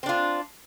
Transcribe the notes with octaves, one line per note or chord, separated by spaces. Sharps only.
C4 D4 F4